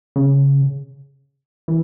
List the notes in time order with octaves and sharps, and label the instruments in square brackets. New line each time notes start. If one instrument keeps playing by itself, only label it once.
[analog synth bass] C#3
E3